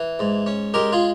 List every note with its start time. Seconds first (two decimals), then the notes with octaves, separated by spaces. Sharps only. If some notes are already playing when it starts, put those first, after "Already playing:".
Already playing: E3
0.19 G#2
0.46 C#4
0.74 G#3 G4 A#4
0.92 F4 G#4